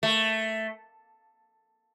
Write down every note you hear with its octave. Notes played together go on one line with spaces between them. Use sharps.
A3